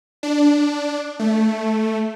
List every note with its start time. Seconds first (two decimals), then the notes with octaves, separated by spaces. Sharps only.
0.23 D4
1.20 A3